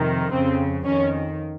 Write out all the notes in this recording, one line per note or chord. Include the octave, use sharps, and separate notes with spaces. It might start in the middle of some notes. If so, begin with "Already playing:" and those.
Already playing: F2 C3 D#3
F2 C#3 C4
F2 D#3 C#4